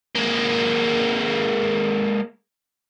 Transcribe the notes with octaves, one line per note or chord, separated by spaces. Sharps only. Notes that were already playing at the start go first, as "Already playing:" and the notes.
G#3 A#3